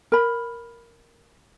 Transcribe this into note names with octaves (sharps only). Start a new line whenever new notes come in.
A#4 B5